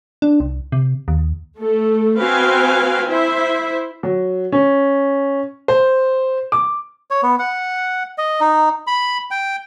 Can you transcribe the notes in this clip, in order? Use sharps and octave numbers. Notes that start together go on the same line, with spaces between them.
D4
C2
C3
D#2
A3 A4
C4 F#4 B4 F5 G5 G#5
E4 C5 E5
F#3
C#4
C5
D6
C#5
B3
F#5
D#5
D#4
B5
G5